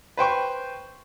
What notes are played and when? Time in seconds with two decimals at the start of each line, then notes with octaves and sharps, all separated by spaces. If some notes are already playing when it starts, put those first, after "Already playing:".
0.17 B4 C5 G5 C#6